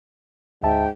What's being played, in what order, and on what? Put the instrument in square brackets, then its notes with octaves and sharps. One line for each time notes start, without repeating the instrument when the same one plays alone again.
[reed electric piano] D2 E5 A5 [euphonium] G#2 [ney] G5